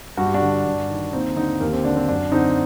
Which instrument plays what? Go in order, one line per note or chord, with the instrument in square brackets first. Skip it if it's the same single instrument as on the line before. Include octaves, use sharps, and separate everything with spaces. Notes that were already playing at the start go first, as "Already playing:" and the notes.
[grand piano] G2 F#4
G4
D4 F#4
D3
G2
D#3
D#2 C4 D#4
D3 C4 D#4
D#2 G4 A#4
C4
D3 D4
C4
F#2 D4
D3 C4 D#4